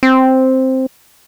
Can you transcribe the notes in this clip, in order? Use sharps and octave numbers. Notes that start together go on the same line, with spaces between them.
C4